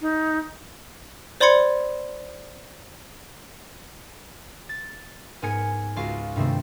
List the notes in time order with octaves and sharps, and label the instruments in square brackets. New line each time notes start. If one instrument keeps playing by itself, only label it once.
[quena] D#4
[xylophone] C5 D5 B5 C6 G#6 C#7
[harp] A6
G#2 B3 A#4 G#5 G#6 C#7
C#2 F4 F#4 F5
G2 C3 D#3 A3 C4